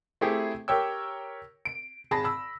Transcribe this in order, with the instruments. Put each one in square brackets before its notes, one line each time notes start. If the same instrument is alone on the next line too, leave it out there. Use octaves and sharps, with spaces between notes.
[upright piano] A3 C4 E4 G4 G#4
G4 A#4 C#5 G5 E6
D7
G#1 G#4 A5 B5 A#6
B5 E6